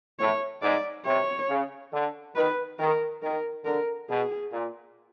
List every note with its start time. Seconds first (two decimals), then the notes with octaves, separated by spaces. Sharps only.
0.19 A2 C#5
0.62 G#2 D5
1.05 C3 C#5
1.49 C#3
1.92 D3
2.36 D#3 B4
2.79 D#3 A#4
3.22 D#3 A#4
3.65 D3 A#4
4.09 B2 G#4
4.52 A#2